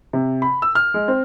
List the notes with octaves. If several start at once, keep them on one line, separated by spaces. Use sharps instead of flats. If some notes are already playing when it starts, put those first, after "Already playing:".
C3
B5
E6
F6
G#3
C4